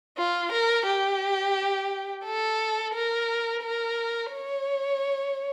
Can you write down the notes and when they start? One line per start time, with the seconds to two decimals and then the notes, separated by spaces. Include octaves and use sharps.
0.17 F4
0.52 A#4
0.86 G4
2.25 A4
2.94 A#4
3.62 A#4
4.33 C#5